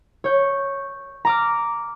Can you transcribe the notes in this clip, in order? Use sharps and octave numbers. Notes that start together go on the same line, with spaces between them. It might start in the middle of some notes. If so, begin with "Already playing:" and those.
C#5 G6
A#5 D6 F6